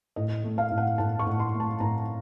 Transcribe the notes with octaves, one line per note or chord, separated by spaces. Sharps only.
A2 D#5
A3
F5
A2
F#5
A2 A5
C#6
A2
C6
A3
A5
A2 A#5